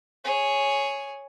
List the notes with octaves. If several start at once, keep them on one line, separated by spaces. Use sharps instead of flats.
G#4 C#5